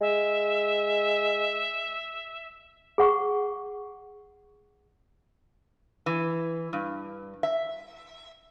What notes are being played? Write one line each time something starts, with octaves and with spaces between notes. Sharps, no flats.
G#3 E5
G#4 F#5 C#6
E3
G2
E5